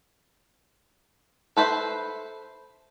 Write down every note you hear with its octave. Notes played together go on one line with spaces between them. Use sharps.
A4 B4 C5 E5